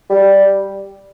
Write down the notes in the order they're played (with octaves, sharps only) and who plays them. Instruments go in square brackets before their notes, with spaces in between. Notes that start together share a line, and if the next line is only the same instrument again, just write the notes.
[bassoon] G3